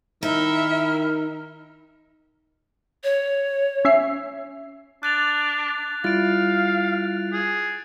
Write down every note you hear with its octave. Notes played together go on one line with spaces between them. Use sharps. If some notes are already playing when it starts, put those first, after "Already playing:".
D#3 D#4 E4 E5 A#5 F6
C#5
C#4 E5 C7
D4 F#6 A6 F7
G3 E4 F4 F5 A6 D7
G#4